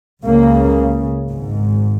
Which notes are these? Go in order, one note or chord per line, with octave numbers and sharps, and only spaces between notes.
C#2 C#3 A#3
G#1 G#2